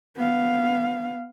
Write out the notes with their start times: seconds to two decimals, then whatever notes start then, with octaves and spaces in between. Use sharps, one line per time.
0.17 B3 F5